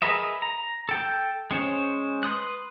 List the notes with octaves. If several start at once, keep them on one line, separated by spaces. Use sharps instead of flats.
G#4 A#4 B4 D#5 E5
A#5
A4 G5 G6
G#3 C#4 C5 C#5
B4 C6 D#6 F#6